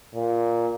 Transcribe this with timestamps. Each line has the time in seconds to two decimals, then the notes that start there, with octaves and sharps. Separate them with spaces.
0.15 A#2